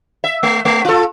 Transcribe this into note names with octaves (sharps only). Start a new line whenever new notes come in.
E5
A3
A3
F4 A4